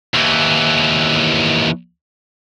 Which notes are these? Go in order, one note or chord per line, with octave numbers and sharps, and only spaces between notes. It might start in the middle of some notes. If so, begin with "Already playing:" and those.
D#2 E3